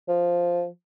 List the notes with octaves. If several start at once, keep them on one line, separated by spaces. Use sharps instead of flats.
F3